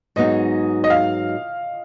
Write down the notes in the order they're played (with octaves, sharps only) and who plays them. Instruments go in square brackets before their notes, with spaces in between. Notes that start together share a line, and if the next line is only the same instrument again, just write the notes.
[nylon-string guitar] G#2 F#3 B3 D#4 G#4 [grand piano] D#5
[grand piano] D#5
F5